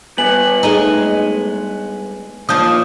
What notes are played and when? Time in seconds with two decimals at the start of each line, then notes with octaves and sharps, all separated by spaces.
0.18 G2 B3 G#5 F#7
0.63 G#3 A3 D#4
2.49 D#2 F3 D4 D#6 G6